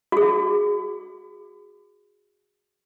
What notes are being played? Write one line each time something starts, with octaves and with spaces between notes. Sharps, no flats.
F#4 G#4